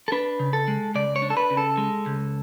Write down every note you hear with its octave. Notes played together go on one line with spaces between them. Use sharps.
A4
D4 B4
C#3
A4
G#3
C#2 D5
C#5
D4
A4
B4
C#3
A4
G#3
C#2